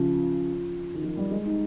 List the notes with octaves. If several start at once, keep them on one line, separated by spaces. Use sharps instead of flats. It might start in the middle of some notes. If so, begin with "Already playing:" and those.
Already playing: C#3 F3
D#3
F3
G3
G#3
D#4